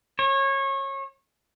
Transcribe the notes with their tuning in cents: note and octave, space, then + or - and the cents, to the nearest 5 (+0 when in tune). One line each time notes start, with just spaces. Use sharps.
C#5 -25